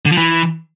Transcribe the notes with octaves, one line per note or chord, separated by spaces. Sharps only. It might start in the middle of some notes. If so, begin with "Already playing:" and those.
D3
F3
E3